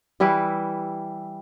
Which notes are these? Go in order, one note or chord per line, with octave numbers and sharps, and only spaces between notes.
E3 G3 E4 B4